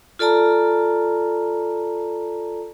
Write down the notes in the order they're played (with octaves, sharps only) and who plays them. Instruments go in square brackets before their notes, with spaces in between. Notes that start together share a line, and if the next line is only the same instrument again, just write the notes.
[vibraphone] F4 A4 D5 A5 A#5